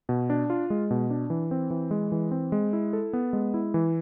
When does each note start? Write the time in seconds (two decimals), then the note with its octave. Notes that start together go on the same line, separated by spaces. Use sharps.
0.09 B2
0.30 D4
0.50 F4
0.70 G#3
0.91 B2
1.10 D4
1.30 E3
1.51 C4
1.70 E3
1.91 G#3
2.12 E3
2.31 C4
2.52 G#3
2.73 E4
2.93 A4
3.13 B3
3.33 G#3
3.54 E4
3.74 E3